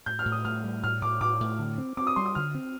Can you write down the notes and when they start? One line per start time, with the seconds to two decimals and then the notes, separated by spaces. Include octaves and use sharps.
0.06 A2 G6
0.19 F6
0.26 A2
0.32 D#6
0.45 A2 F6
0.64 G3
0.83 A2 F6
1.02 A2 D6
1.20 A2 D6
1.40 A2
1.59 D3
1.78 C4
1.97 C4 D6
2.07 D#6
2.16 G3 C6
2.26 D#6
2.35 D3 F6
2.55 C4